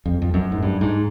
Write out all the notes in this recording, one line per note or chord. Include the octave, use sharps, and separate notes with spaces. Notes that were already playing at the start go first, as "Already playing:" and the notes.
F2
F2
F#2
G#2
G2
G#2